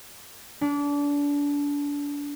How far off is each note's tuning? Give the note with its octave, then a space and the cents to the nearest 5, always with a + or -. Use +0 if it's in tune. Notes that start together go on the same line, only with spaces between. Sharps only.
D4 -30